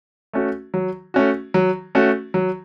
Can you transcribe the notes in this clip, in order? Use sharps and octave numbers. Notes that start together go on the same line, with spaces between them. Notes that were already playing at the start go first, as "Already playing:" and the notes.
A3 C#4 F#4
F#3
A3 C#4 F#4
F#3
A3 C#4 F#4
F#3